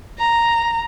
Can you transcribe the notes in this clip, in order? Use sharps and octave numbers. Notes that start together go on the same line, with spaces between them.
A#5